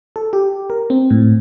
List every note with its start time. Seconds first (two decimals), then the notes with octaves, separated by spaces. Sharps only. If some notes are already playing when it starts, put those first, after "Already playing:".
0.16 A4
0.33 G4
0.70 A#4
0.90 C4
1.10 A2